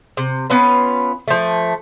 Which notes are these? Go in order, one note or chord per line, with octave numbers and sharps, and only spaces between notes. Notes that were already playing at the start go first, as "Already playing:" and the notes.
C3
B3 C#4 F4 B4
F3 A3